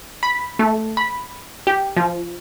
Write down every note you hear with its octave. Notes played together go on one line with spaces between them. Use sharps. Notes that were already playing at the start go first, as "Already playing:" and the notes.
B5
A3
B5
G4
F3